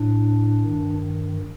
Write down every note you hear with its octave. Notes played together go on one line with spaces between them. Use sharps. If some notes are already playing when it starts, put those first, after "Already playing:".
Already playing: A2 D4
G2 D#3